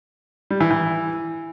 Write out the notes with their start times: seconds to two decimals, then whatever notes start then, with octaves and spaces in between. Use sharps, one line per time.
0.50 G3
0.61 E3
0.71 E3